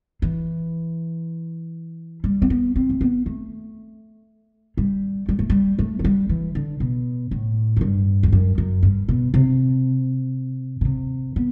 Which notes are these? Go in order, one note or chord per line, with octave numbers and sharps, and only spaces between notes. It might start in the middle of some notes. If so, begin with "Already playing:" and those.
E3
G3
C4
B3
C4
A3
B3
A3
G3
G3
A3
G3
A3
F#3
G3
E3
D3
B2
A2
F#2
G2
E2
F#2
F#2
G2
B2
C3
B2
C3
B3